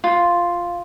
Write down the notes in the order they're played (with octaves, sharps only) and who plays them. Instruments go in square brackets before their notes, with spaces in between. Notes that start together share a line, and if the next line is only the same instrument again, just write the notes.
[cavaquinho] F4